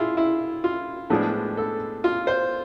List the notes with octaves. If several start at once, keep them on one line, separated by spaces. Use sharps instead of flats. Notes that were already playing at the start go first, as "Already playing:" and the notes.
Already playing: E4 F4 G#4
E4
F4
A2 F3 G#3 B3 D4 G#4
A4
F4
C5